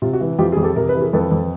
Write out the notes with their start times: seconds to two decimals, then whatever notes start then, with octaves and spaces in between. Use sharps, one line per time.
0.02 C3 F4
0.13 F#4
0.20 E3
0.39 F2 F4 G4
0.52 F2 G#4
0.63 G4 A4
0.76 C3 A#4
0.89 B4
0.95 E3
1.01 G#4 A#4
1.13 F2 A4 B4
1.31 F2